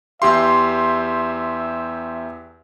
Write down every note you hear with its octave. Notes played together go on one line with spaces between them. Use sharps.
E2 G4 E5 C6